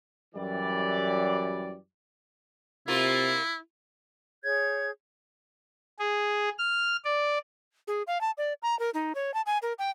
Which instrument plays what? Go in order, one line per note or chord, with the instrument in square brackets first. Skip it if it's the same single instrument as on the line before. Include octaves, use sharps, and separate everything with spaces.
[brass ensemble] F#2 E3 G3 D5
[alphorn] C3 [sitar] A#3 F4 [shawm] E4
[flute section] G#4 C#5 G6 G#6
[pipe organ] G#4
F6
D5
[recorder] G#4
F5
A5
D5
A#5
A#4
D#4
C#5
A5
G#5
A#4
G5